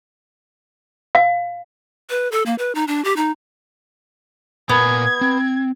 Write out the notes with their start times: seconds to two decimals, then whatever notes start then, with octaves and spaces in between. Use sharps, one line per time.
1.15 F5
2.10 B4
2.32 A4
2.46 A#3
2.58 B4
2.75 D#4
2.88 D4
3.04 G4
3.16 D#4
4.69 A#2 B3 A#4 G#5 G#6
5.21 C4